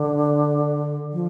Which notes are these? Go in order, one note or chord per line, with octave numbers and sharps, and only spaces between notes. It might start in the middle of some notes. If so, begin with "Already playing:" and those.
Already playing: D3
F3